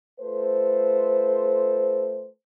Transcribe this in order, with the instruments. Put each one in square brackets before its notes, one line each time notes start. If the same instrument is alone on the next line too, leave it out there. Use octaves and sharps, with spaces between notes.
[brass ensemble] A3 F4 A4 B4 C5